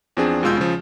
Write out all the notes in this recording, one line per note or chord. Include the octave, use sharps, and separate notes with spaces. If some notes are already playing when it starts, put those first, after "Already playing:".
E2 F3 C4 D4 G#4
D#2 B2 G#3 F4 E6 G6
C#3 F3